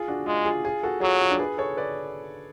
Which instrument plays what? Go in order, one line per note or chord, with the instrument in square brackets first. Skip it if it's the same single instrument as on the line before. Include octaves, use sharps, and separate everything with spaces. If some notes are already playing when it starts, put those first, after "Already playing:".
Already playing: [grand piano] F4 G#4
D4 F#4
[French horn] G#3 [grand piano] F4
[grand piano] F4 G#4
F4 G#4
F#4 A4
[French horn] F#3 [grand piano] F4 G#4
[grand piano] F4
D4
G#4 B4
A4 C#5
B4 D5